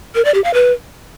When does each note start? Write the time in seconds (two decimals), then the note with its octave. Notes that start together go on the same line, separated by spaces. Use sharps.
0.15 A#4
0.25 D5
0.34 G4
0.44 F5
0.54 B4